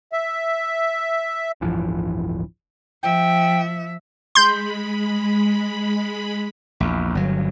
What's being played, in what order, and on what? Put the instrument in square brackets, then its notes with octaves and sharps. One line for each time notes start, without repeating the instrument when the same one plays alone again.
[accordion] E5
[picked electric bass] D1 G1 E3 F3
[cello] F3 E5 [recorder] G5
[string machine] G#3 B5 [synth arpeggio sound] C6 G6
[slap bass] A#1 E2
G1 F#3